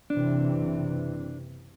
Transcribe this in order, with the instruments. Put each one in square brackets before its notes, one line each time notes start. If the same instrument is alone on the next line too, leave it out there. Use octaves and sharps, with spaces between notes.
[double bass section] F#1 C3 E3 [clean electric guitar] D4